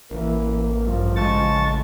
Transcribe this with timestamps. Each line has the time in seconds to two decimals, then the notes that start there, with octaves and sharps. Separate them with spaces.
0.11 A1 E3 A#3
0.83 G2 F3
1.16 C#3 G#3 A5 C#6 A6